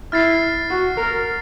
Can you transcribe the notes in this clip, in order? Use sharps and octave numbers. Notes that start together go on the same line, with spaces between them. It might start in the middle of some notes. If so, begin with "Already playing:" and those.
E4 F6 A6 C7
F#4
A#4